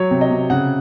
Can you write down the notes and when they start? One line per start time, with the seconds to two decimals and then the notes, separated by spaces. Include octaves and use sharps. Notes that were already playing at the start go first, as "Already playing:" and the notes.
Already playing: F#3 C#5
0.11 C3
0.21 D#5
0.31 C3
0.50 C#3 F#5